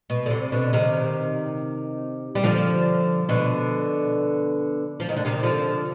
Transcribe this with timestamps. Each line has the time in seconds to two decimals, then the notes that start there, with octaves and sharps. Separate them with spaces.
0.10 B2
0.26 D3
0.30 C3
0.52 B2 D3
0.73 C3 D#3
2.35 G3
2.44 D3 F3
3.29 B2 D3
5.00 F3
5.09 D#3
5.16 D3
5.25 C3 D#3
5.43 D3 F3